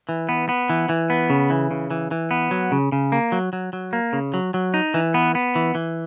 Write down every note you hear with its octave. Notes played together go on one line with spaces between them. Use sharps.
E3
B3
B3
E3
E3
B3
C#3
E3
C#3
E3
E3
B3
F#3
C#3
C#3
A#3
F#3
F#3
F#3
A#3
C#3
F#3
F#3
D#4
E3
B3
B3
E3
E3